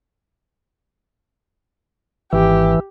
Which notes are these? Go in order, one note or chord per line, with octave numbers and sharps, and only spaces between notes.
G#1 E3 G4